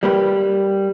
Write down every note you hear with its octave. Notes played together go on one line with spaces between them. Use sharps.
G3 A#3 G4 B4